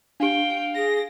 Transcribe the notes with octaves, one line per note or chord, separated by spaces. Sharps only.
D4 G4 F5 G5
G#4 A#6